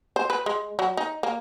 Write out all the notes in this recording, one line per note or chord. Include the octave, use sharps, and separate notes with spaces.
C5
B4
G#3
F#3
D#4
A#3